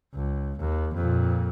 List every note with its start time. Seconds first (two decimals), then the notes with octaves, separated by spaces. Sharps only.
0.15 C#2
0.59 D#2
0.95 F2 A#2